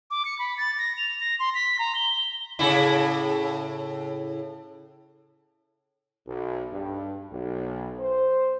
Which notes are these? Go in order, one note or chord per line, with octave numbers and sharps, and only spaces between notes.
D6
C#7
B5
A6
A#6
F7
A#6
C6
B6
A#5
G7
A2 C#3 E4
B1
G2
B1
C5